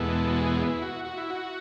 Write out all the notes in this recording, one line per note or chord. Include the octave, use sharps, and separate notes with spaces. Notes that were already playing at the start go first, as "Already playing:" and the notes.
Already playing: E2 B2 G#3 B3 E4 A4
F#4
G#4
E4
F#4
F#4
E4
F#4